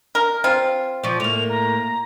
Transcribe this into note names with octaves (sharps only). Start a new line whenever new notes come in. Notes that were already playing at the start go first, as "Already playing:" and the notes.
A#4 F6
C4 F4
F3 D5 C#6
A2 A#3 F7
A#5